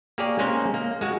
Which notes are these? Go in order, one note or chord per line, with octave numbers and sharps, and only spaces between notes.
A#3 G4 G#4 C#5 D5
G#3 A#3 C4 C#4 A#4 C5
A#3
G#3 F#4